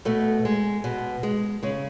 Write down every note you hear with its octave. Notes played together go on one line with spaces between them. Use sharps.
B2 A3
G#3
B2
G#3
C#3 G#3